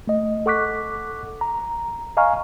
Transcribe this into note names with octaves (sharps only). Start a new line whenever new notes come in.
A3 D#5
A4 F#5 C#6 D6 F#6 B6
A#5
D#5 F5 G#5 A#5 C#6 F6